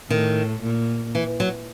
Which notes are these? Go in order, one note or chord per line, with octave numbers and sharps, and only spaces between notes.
A2 D#3
A#2
E3
F#3